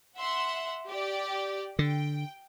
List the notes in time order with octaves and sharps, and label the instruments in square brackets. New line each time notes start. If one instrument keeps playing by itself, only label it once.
[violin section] E5 F#5 C6
G4 D5
[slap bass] D3 [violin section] G5